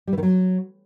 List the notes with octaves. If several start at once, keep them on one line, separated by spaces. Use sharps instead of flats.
G3
E3
D#3
F#3